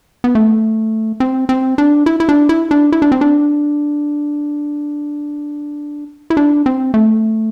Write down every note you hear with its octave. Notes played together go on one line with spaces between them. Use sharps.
B3
A3
C4
C4
D4
E4
E4
D4
E4
D4
E4
D4
C4
D4
E4
D4
C4
A3